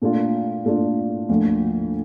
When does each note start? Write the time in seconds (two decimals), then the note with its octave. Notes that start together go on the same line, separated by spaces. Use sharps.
0.02 A#2 A3 D4 F4
0.65 A#2 A3 D4 F4
1.29 D2 D3 F3 A#3 F4